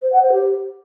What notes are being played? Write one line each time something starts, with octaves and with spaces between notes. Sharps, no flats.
C5
F#5
C5
G4